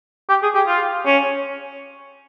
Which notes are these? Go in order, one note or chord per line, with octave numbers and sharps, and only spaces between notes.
G4
G#4
G4
F4
C#4